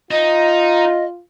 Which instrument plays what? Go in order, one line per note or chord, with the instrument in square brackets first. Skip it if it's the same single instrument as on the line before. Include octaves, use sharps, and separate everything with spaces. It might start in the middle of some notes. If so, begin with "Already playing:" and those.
[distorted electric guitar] D#4 [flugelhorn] F4 [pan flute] D#5